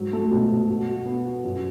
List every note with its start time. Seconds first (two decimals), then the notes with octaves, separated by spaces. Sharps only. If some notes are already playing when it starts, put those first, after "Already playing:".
Already playing: G#2 F#3
0.13 A3
0.31 B2
0.50 B2
0.69 F#4
0.88 F#4
1.06 B3
1.25 F#4
1.44 F#2